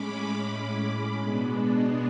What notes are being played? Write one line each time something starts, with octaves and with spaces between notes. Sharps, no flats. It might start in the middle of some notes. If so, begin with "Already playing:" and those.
Already playing: A2 G#3 C#4 B5 D6
B2 G#3 B3 D4